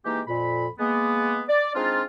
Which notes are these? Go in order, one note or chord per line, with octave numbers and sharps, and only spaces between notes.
E3 G#3 A#3 D#4 G4
F2 A#2 B5
G#3 A#3 B3
D5
G#3 C4 D4 D#4 F4